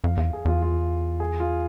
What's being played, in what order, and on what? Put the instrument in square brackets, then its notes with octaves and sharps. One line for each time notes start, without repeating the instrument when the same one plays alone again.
[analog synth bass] F2 [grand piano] F5
[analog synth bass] E2 [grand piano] F5
[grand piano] G#4
[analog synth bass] E2 [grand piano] F4
[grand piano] F4
G#4
F4